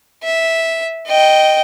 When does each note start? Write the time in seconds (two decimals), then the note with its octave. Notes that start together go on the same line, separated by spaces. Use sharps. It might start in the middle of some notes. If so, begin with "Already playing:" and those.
0.24 E5
1.07 D#5 G5